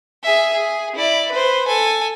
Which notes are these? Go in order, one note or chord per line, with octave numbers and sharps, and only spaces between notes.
G#4 E5
G#4
E4 D5
B4 C5
A4 G#5